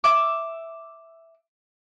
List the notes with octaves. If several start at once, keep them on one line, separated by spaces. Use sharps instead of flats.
E5 D6